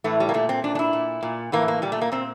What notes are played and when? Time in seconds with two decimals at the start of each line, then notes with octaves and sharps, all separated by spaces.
0.04 A2 E3 A3
0.20 G3
0.29 A#3
0.34 A#2 A3
0.49 C4
0.64 A#2 D4
0.75 D4
0.79 E4
0.93 A#2
1.23 A#2
1.52 A2 E3 A#3
1.68 A#3
1.82 A#2 G3
1.92 A3
2.01 A#3
2.12 A#2 C4